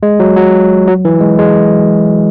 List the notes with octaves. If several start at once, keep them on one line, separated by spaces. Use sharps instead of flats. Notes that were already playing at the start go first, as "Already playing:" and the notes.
G#3
F#3
F#3
F#3
E3
G#3
G#3